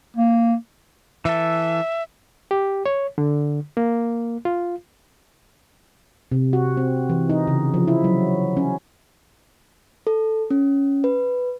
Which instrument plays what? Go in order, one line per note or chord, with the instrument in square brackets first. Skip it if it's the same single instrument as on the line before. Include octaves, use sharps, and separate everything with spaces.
[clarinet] A#3
[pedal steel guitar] E3 A4 [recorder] E5
[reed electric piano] G4
C#5
D3
A#3
F4
[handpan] C3
F#4
C4
E3
D#4
C#3
F3
E4
F#3
C#4
[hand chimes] A4
C#4
B4